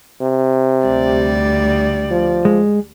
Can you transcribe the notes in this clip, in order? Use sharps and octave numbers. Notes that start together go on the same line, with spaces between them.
C3
D2 G3 D5
F3
G#3